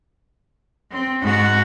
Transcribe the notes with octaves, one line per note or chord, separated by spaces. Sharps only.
C4
G#2 F#4